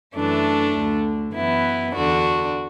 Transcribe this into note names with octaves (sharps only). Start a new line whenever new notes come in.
F#2 E3 A3 D4
D2 D3
F#2 E3 B3 E4
E2 D3 D4 F#4